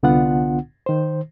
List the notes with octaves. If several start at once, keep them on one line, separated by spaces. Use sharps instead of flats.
C2 D3 B3 D4 F4 F#5
D#3 C5